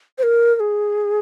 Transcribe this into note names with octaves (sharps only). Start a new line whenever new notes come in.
C5
A#4
A#4
G#4